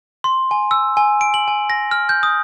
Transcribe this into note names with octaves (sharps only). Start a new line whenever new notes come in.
C6
G#5
E6
G#5
D7
F#7
G#5
A#6
F6
G6
D#6